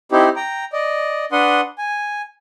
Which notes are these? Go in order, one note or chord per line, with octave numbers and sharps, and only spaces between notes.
C4 D#4 E4 G4
G5 A#5
D5 D#5
D4 B4 F#5 C6 D#6
G#5